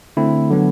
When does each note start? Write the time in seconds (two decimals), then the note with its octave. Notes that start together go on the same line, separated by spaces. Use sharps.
0.17 D3 A3 C4 E4
0.50 D3 F#3 B3